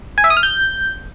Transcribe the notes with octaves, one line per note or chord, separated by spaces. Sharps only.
G#5
E5
D#6
F6
G6